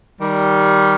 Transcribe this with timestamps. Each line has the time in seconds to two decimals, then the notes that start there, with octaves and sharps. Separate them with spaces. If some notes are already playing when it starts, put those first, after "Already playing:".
0.22 D#3 G3